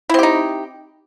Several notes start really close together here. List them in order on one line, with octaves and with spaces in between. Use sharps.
E4 C4 G4 D#4